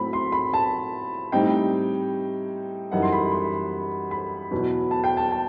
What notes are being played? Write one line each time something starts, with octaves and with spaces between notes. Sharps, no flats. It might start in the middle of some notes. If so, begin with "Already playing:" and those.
Already playing: A2 F#3 C4 B5
C6
B5
A5
A2 G3 C4 D#4 G5
F#2 E3 G3 D#4 F#5
C6
B5
C6
B5
E2 B2 F#3
A5
G5
A5
A5